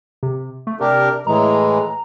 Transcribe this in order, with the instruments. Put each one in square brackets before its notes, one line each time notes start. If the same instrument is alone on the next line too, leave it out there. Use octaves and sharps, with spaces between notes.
[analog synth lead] C3
A3
[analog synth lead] C3 [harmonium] D4 G4 A#4
[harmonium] A2 E3 G#3 [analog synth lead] A#5